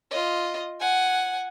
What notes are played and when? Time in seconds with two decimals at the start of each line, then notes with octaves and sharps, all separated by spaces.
0.11 F4 D#5
0.80 F#5 G#5